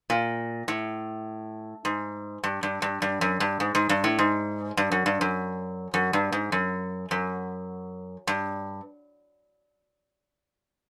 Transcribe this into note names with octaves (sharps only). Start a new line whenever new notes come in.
A#2
A2
G#2
G2
G2
G2
G2
F#2
G2
G#2
G#2
G2
A2
G#2
G2
F#2
G2
F#2
F#2
G2
G#2
F#2
F#2
G2